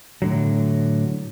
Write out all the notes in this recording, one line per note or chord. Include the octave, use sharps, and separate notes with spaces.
A2 D3 F#3